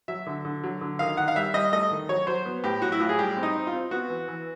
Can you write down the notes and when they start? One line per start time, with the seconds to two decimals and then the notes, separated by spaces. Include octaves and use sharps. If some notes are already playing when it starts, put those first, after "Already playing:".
0.08 F#3 E5
0.26 D3
0.45 D3
0.63 F#3
0.81 D3
0.99 D#3 F5
1.17 D#3 F#5
1.28 F5
1.36 G3 E5
1.54 G3 D#5
1.73 A3 D#5
1.91 D#3
2.09 F#3 C#5
2.27 F#3 C5
2.45 B3
2.64 A2 G4
2.82 F#3 F#4
2.92 E4
3.00 A2 F4
3.09 G#4
3.19 G3 G4
3.37 C4
3.43 D#4
3.56 C4
3.67 F4
3.73 C4
3.91 B3 F#4
4.10 E3
4.28 E3